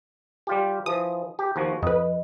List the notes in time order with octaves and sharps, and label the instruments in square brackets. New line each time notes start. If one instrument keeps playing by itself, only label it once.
[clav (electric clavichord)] G3 F4 G4
[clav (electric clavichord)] E3 F3 [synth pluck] D#6
[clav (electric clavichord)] G4
D#2 F3 F#4
[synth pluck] F2 B4 [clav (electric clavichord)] D#5